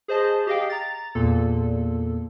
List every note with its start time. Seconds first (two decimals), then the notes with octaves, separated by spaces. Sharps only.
0.08 G#4 C5 D#5 A5
0.47 G4 G#4 D#5 F5 G5
0.70 A#5 A6
1.15 E2 A#2 A#3 A4